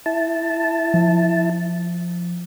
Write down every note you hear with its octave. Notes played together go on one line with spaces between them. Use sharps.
E4 A5
F3